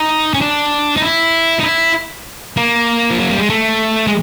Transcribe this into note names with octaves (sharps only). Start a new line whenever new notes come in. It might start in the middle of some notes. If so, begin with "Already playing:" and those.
Already playing: D#4
C#4
D4
D#4
E4
D#4
E4
A#3
F3
F#3
G3
G#3
A3
G#3